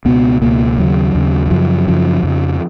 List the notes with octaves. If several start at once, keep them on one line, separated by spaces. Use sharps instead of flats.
C#2 B2 B3
C#2 B2 A#3
D#2 C#3 F#3
D#2 C#3
F#3
F#2 C#3 F3
F#2 C#3 F3
F2 C#3